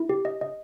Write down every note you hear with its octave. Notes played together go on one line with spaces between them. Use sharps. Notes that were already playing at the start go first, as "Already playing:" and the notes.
Already playing: E4
G4
D#5
D#5